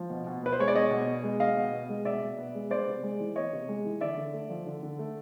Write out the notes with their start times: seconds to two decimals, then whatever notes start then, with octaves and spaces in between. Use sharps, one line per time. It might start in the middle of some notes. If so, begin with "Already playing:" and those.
Already playing: F3
0.10 B2
0.27 B2
0.43 B3 B4
0.53 C5
0.59 G#3 C#5
0.68 D5
0.75 B2 C#5 D#5
0.91 B2
1.07 B3
1.24 G#3
1.40 B2 D#5 F5
1.57 B2
1.73 B3
1.89 G#3
2.05 B2 D5 E5
2.22 B2
2.38 B3
2.55 G#3
2.71 B3 C5 D5
2.87 C3
3.03 G#3
3.20 E3
3.36 B3 C#5 D#5
3.53 C3
3.69 G#3
3.86 E3
4.01 D3 D5 E5
4.17 D3
4.34 A3
4.50 F3
4.67 D3
4.83 D3
4.99 A3